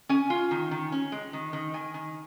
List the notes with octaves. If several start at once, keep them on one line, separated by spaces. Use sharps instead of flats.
C#4 G#5
F4
D#3
D#3
C#4
G#3
D#3
D#3
D#3 G#5
D#3